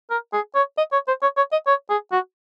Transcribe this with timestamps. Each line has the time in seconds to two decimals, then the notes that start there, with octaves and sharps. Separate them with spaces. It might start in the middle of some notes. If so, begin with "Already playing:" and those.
0.11 A#4
0.33 G#4
0.55 C#5
0.78 D#5
0.93 C#5
1.08 C5
1.22 C#5
1.37 C#5
1.52 D#5
1.67 C#5
1.90 G#4
2.12 F#4